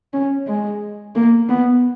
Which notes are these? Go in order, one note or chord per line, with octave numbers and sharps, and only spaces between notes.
C#4
G#3
A#3
B3